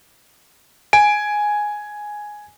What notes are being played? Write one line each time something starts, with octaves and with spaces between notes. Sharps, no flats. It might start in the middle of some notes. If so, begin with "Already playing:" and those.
G#5 D7